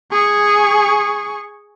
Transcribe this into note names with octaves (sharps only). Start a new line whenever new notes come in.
G#4 C#6